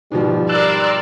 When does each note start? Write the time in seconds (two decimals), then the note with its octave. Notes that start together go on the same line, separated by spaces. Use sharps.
0.12 G#2 B2 F3 G3
0.49 A#4 D5 C6 E6 F#6